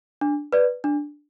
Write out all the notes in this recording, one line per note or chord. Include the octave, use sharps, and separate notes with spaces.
D4
B4 D5
D4